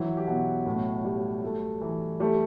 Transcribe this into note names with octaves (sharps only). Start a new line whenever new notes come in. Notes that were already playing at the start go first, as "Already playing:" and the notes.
Already playing: E3 F#3 E4
G4
B2 F#3 F#4
A2
G3
A3
E3
G3 A3 G4